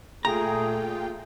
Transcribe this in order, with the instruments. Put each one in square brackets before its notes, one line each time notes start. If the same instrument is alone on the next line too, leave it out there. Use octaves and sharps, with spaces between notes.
[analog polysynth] A#2 F4 G5 [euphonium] A3 [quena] G#4 [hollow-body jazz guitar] A#5